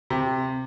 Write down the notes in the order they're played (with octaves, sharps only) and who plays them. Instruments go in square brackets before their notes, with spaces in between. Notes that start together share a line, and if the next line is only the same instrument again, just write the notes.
[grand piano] C3